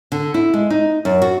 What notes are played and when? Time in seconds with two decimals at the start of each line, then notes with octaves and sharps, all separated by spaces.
0.12 D3
0.34 E4
0.54 G#3
0.70 D#4
1.05 F#2
1.22 F#4